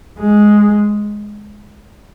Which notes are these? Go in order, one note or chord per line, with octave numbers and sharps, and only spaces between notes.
G#3